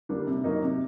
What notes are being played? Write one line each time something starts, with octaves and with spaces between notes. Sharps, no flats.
D3 G3 A#3 D4
C3
D#3 F#3 A#3 D#4
C3